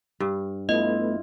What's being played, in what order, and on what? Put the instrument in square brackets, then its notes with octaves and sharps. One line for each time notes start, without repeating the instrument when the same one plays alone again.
[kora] G2
[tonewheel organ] A3 B3 [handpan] E4 F4 [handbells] D#5